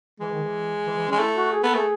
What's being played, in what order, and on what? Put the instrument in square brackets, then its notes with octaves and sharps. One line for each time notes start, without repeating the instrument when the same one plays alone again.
[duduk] E3 [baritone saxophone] G#3
[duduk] D#3
E3
E3
E3
C#4
[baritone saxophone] G#3
[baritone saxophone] A3 [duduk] E4
[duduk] F#4
G#4
[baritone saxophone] B3 [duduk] A4
[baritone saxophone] A3 [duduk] G#4